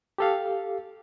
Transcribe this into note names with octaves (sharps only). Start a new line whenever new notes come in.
G4 A4 F5